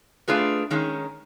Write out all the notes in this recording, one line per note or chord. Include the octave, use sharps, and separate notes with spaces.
A3 D4 F4 G#4 B4
D#3 G#3 C#4